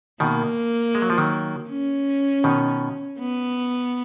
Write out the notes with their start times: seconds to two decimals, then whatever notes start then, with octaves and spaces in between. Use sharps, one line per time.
0.20 B2 D#3 A#3
0.95 G#3
1.02 F#3
1.10 F3
1.18 D#3 F#3
1.69 C#4
2.44 B2 D#3
3.19 B3